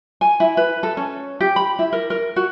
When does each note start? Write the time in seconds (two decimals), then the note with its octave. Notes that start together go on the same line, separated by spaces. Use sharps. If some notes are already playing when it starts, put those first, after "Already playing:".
0.21 G#5
0.40 E4
0.57 B4
0.83 A4
0.97 C#4
1.41 G4
1.56 B5
1.79 E4
1.93 A#4
2.10 A#4
2.36 F#4